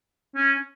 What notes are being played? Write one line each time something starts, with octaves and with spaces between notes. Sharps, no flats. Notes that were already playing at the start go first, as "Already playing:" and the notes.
C#4